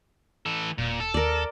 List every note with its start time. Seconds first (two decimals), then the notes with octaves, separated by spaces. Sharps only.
0.46 E3 A4
0.78 E1 A#2
1.00 A4
1.14 D#2 A#4 D5